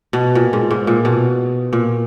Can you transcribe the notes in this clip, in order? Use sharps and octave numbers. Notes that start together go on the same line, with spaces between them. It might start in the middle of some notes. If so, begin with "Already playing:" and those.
B2
A#2
G#2
G#2
A#2
B2
A#2